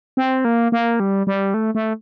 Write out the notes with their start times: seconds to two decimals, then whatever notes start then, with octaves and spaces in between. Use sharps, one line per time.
0.17 C4
0.45 A#3
0.72 A#3
1.00 G3
1.27 G3
1.54 A3
1.75 A3